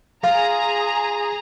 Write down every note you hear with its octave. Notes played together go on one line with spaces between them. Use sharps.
F4 G#4 A#5